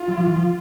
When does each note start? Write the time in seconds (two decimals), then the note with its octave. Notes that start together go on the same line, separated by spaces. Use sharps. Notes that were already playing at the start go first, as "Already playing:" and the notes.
Already playing: F4
0.08 F#3
0.17 F3
0.26 E3
0.36 F3